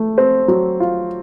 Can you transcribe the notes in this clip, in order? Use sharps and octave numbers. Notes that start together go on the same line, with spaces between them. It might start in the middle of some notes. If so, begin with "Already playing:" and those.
Already playing: A3
C4
F#3
F4